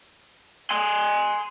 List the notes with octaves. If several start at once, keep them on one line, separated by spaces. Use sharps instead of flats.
G#5 C6